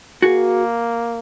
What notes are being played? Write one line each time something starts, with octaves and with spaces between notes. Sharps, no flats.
A#3 F#4 G#4